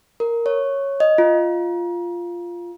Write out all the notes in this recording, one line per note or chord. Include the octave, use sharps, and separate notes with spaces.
A#4
C#5
D#5
F4